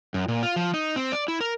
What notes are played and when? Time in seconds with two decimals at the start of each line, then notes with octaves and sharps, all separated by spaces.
0.14 F#2
0.28 A#2
0.43 F4
0.56 F3
0.74 D#4
0.96 C4
1.12 D5
1.28 E4
1.41 A#4